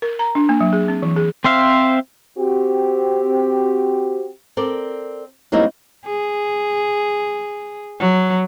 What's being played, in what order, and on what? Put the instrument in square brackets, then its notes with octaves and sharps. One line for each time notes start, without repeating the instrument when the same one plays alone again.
[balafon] A#4
A#5
D4
A#3
F#3
G#4
C4
E3
G#4
[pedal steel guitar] C4 C5 E5 F5
[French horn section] C4 F#4 G4
[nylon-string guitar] C4 A4 A#4 D5
F#3 G3 A#3 C4 D#4 E4
[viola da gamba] G#4
F#3